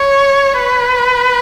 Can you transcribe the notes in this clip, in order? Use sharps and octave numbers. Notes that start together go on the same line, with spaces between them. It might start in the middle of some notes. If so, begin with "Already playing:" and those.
Already playing: C#5
B4